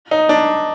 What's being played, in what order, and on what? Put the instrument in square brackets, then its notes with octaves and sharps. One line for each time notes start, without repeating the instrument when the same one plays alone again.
[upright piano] D#4
D4